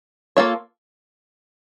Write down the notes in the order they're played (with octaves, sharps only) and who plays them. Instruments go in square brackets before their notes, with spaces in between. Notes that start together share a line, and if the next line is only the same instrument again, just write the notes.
[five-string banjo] A#3 D4 F4 A4 C#5